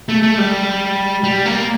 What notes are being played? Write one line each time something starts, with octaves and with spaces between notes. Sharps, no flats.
A3
A3
G3
G3
A#3